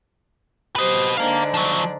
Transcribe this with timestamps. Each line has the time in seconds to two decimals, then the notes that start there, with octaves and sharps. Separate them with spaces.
0.76 F#3 G4 B4 C5 D#5
1.17 G#2 D3 D4 A#4 F5
1.54 F3 F#3